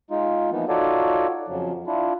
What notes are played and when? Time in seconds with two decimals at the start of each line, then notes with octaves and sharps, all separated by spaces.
0.11 G#3 D#4 F4
0.52 E3 F3 A#3 B3 D#4
0.68 D#4 F4 F#4 A4 C#5 D5
1.48 F2 C#3 F3 F#3
1.87 D4 E4 F4